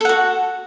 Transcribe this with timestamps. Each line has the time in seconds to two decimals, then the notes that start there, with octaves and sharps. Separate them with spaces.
0.01 A4
0.05 F#5
0.09 F#4